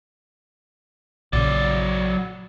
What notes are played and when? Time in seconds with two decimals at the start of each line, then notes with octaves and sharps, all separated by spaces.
1.33 A#1 A#2 C#3 F#3 D5